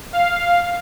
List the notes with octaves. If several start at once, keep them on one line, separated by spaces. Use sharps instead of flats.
F5